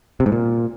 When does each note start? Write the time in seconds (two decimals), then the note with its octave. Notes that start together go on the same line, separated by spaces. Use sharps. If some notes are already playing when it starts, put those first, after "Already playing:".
0.20 C3
0.26 G#2
0.32 A#2